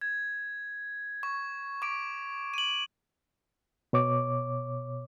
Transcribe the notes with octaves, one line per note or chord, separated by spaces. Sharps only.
G#6
C#6
C#6 D6 D7
D#7 F#7
B2 C#5 D6